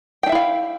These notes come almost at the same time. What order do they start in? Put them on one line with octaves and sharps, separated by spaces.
G5 D4 E5 E4 F5